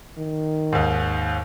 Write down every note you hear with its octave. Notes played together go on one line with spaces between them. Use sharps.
D#3
D#2 G#2